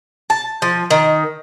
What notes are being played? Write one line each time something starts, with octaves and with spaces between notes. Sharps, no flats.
A5
F3
D#3